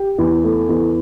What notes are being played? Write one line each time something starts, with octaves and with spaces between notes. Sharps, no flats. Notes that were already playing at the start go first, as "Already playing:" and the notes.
Already playing: G4
E2
A3
E2